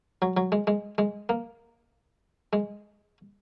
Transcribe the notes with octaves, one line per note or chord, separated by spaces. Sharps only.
F#3
F#3
G#3
G#3
G#3
A#3
G#3